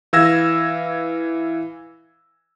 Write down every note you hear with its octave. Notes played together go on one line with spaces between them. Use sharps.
E3 F5 E6 G#6 A#6 E7